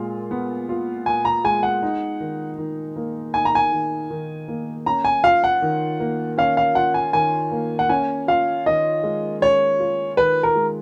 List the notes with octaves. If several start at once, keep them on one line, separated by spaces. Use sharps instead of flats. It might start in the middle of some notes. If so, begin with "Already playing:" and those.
Already playing: A#2 G#3 F4
B3
F4
A#2 G#5
A#5
G#3 G#5
F#5
D#4
D#3
D#3
A#3
D#4 G#5
A#5
G#5
D#3
D#3
A#3
C#4 A#5
G#5
F4 F5
F#5
D#3
A#3
C#4 F5
F5
F4 F#5
G#5
D#3 G#5
A#3
F#5
C#4 G#5
F4 F5
D#3 D#5
G#3
C#4 C#5
F4
D#3 B4
A#4
G#3